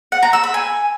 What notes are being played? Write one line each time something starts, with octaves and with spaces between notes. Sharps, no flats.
F#5
A#5
E6
B5
G#5